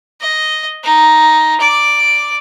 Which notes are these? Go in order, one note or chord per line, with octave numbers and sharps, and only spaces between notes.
D#5
D#4
D5 D6